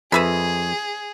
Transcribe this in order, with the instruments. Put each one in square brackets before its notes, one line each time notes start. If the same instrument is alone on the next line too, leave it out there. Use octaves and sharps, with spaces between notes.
[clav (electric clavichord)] F2 [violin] G#4 [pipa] B4 E5 B5